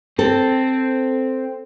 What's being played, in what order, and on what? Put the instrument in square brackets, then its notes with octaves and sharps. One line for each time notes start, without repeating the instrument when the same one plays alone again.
[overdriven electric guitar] C4 [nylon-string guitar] A4